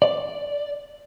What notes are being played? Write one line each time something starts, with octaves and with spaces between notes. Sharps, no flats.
D5